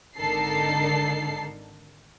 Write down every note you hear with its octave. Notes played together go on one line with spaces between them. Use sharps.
G#1 D3 D#4 A4 A#4 C7